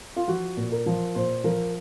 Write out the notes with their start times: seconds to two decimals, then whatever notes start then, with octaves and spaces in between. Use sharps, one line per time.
0.16 F4
0.28 F3 F#4
0.57 A#2
0.72 A#4
0.86 F3
1.15 A#2 C5
1.44 F3 A#4